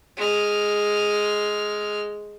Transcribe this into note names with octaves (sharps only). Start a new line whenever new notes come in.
G#3 F6